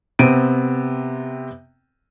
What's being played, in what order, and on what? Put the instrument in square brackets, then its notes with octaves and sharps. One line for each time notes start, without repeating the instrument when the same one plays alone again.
[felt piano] C3 B3 C4 D7 D#7